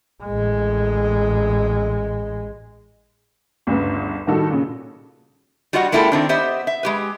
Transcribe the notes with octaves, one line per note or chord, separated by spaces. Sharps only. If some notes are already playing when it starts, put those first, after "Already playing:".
A1 G#3
G1 D2 C#3 B3
A2 D#3 G3 D#4 F#4 A4
A#2 C#3
G3 F4 F#4 D#5 F#5
G#3 A#3 E4 F4 A4 G5
D#3 C4 D4
B3 G4 C5 D#5 E5
E5
G#3 G4 B4